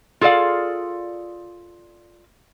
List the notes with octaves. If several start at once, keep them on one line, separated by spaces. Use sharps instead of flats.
F4 G#4 A4 D5 F5